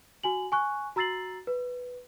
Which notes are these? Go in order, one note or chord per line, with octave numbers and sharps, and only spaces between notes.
F#4 G#5 F#7
G#5 C#6 F#6
F#4 A#5 E6 A6 C7 F#7
B4